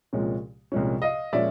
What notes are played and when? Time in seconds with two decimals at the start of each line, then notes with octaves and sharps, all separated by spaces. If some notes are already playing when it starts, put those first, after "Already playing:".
0.13 C2 A#2 F3 G#3 C#4
0.72 C2 A#2 F3 G#3 C#4
1.02 D#5 F5
1.33 A#2 F3 G#3 C#4 D5 E5